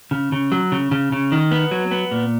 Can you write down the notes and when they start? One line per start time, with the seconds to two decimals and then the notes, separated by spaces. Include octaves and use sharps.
0.11 C#3
0.32 C#3
0.52 F#3
0.72 C#3
0.91 C#3
1.12 C#3
1.32 D#3
1.51 B3
1.71 F#3
1.91 B3
2.11 A#2